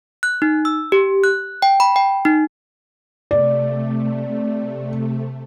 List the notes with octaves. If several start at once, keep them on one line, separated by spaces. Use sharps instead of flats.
F#6
D#4
E6
G4
F#6
G5
B5
G5
D#4
C3 A3 D5